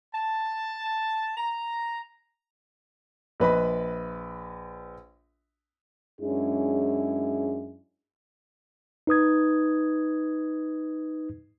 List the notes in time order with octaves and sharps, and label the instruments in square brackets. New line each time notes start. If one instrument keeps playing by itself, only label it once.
[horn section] A5
A#5
[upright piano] A#1 B4 D#5 B5
[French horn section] F#2 G#3 C#4 D4 E4 G#4
[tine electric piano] D#4 B4 D#6 G#6